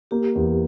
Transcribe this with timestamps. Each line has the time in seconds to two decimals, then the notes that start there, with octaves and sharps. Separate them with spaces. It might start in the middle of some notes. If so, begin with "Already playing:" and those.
0.11 A#3 G4
0.35 E2